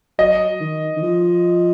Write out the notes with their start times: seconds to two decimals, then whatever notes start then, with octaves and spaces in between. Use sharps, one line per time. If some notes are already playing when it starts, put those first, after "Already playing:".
0.19 F#3 D#5
0.60 D#3
0.97 D#3
1.02 F3